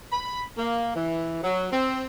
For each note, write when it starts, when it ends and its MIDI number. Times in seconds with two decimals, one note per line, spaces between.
0.12 0.43 83
0.57 0.92 58
0.95 1.43 52
1.43 1.68 54
1.72 2.06 60